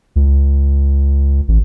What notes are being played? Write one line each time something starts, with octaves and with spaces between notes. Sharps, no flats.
C#2
A1